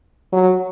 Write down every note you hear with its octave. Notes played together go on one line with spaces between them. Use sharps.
F#3